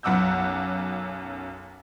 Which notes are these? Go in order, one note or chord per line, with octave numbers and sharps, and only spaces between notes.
B1 F#2 F#5 D6 E6 G6